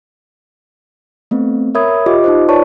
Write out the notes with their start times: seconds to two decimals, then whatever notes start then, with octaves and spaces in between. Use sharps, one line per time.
1.31 A3 B3 C4
1.75 A#4 C#5 E5 B5 D#6 G#6
2.06 F4 G4 D#5 D6
2.24 D#4 F4 C5
2.49 B4 C#5 D5 A5 C#6